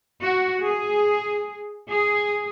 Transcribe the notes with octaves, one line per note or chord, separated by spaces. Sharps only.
F#4
G#4
G#4